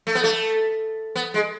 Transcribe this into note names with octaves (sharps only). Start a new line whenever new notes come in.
A3
B3
A3
B3
G#3